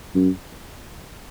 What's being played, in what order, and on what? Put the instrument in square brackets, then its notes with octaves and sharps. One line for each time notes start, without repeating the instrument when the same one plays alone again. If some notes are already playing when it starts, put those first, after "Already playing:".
[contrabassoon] F#2